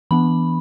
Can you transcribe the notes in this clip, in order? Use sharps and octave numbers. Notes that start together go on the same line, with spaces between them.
E3 B3 D4 B5